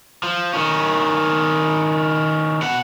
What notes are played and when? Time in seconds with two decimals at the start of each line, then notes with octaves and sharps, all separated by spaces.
0.23 F3
0.53 D#3 C#4
2.62 B2 F#5